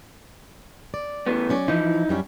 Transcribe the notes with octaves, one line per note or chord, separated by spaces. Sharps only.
D5
E3 A3 B3
F#3 C#4 D5
E3 F3 D#4 E4
F#2 G3 C#4